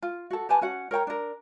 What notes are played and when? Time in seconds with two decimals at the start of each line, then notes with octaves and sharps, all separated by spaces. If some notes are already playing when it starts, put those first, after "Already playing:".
0.02 F4
0.30 F#4 A4
0.49 G4 B4 G#5 A5
0.61 C#4 F#4 F#5
0.91 A#4 C#5 G5 A#5
1.07 D4 A#4